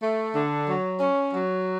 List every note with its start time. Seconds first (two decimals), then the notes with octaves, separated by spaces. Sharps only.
0.03 A3
0.35 D3
0.68 F#3
1.00 C#4
1.33 F#3